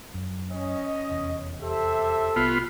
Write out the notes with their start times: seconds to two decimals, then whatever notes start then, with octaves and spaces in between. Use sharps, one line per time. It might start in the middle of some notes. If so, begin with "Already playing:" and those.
0.14 F#2
0.51 C#4 D#5
1.09 F1 E2
1.62 G4 A4 C5 E5
2.36 C2 B3 F4